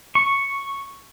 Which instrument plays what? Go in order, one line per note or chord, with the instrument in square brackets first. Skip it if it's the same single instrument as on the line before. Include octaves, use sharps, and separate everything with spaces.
[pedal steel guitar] C#6